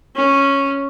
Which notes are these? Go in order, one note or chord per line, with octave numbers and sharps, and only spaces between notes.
C#4